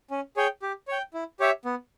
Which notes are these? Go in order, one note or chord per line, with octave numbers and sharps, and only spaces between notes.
C#4
G#4 C#5 G5
G4
C#5 G5
E4
G4 C#5 E5
B3